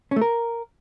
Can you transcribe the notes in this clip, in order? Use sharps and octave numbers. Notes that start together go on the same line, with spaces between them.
C#4
A3
A#4